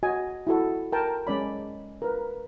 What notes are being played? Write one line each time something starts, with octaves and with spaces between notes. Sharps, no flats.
F#4 D#5 G#5
E4 F#4 A4
A#4 G5 A5
G#3 C#4 D5 B5
A#4 B4